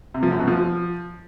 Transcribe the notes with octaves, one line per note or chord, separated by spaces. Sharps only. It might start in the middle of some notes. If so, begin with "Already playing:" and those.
C3
F3
F#2
B2
F3